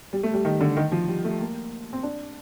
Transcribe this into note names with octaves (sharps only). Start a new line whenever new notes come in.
G3
A3
G3
D#3
D3
D#3
F3
G3
A3
A#3
C4
D4